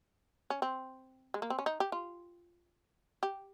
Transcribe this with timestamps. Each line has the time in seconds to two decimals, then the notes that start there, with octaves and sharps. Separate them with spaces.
0.50 C#4
0.62 C4
1.34 G#3
1.42 A#3
1.50 C4
1.59 C#4
1.66 D#4
1.80 G4
1.92 F4
3.23 G4